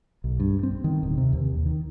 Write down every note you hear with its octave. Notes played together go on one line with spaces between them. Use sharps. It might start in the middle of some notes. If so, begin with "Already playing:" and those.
B1
G2
C4
D#3
D1
C3
D#2
D#3